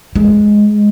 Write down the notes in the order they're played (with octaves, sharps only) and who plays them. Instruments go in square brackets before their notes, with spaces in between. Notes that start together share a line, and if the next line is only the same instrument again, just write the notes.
[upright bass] G#3